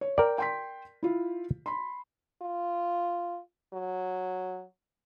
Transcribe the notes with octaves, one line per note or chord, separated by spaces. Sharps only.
C#5
A#4 D5 G5
G5 C6 B6
E4 F4
B5 C6
F4
F#3